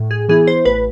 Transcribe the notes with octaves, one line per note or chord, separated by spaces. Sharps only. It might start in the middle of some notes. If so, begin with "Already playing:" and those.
Already playing: A2
G#4
E3 B3 E4 G#4
C5
A1 B4